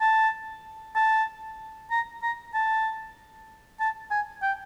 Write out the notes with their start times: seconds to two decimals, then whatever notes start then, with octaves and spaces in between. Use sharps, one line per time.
0.01 A5
0.95 A5
1.91 A#5
2.22 A#5
2.54 A5
3.80 A5
4.11 G#5
4.42 G5